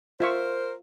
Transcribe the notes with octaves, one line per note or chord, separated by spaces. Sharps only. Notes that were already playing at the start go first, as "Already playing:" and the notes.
F4 A#4 C5 E5 C#6